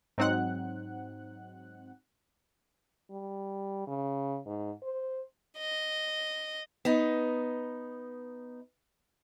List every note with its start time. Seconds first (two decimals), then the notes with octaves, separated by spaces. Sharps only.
0.18 G#2 F#3 C4 D#4 F#5 F#6
3.11 G3
3.87 C#3
4.46 G#2
4.83 C5
5.58 D#5
6.85 B3 D#4